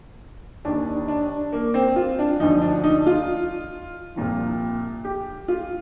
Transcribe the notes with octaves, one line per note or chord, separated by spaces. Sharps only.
D#2 D#3 D4
D4
A#3
C4
F4
D4
D2 D3 F3 D#4
D4
D#4
F4
C2 A#2 F3
G4
F4